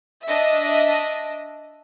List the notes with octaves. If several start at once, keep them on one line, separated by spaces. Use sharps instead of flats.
D4 D#5 E5